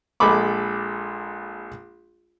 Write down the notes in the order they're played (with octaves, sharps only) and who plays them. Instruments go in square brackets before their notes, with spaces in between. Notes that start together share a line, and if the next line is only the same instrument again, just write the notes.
[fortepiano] A#1 G#3 A4 B5 D6